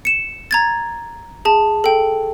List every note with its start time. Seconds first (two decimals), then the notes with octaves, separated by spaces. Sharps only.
0.05 C#7 E7
0.51 A#5 G#6 A6
1.45 G#4 A5
1.84 A4 G5